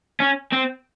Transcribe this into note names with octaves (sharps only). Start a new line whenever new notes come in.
C#4
C4